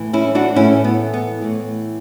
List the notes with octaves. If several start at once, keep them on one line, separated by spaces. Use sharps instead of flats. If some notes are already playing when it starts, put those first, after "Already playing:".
Already playing: A2 E3 A3
C#4 E4
D4 F#4
A2 E3 A3 C#4 E4
B3
B3
A2 E3 A3